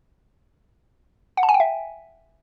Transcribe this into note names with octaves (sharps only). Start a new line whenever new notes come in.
F#5
A5
G#5
G5
E5